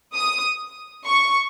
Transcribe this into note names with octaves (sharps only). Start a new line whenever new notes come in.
D#6
C#6